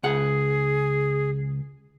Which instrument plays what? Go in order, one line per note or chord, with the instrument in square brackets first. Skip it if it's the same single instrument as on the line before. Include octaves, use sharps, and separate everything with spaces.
[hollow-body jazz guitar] C#2 F#5 [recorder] G#4